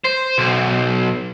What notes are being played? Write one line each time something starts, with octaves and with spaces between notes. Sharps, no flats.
C5
B1